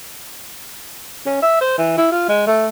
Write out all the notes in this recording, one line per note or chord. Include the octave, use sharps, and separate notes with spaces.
C#4
E5
C5
E3
E4
F4
G#3
A3